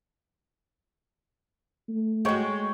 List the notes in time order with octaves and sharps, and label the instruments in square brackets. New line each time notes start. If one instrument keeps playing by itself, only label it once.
[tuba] A3
[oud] G#3 F#4 [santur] C#5 G5